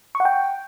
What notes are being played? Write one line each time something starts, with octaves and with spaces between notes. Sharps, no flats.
C#6
F#5
G5